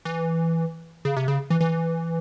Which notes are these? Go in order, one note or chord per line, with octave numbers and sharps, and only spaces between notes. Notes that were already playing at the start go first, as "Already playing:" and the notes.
E3
C#3
C3
C#3
E3
E3